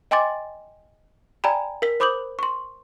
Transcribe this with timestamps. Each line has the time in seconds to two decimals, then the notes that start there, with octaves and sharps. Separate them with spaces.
0.11 D#5 G5 G#5 C6 D6 A6
1.44 D5 G5 G#5 A#5 B5
1.82 A#4 B6
2.00 C5 B5 D6 D#6 G6 F#7
2.39 C6 C#6